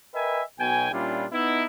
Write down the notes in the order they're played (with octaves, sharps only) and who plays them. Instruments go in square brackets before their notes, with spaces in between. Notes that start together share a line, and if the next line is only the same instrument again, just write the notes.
[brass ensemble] A#4 B4 D#5 E5 G5 G#5
B1 B2 B3 G5 G#5
A#2 G3 C#4 D4 E4 F4
B3 D#4 E4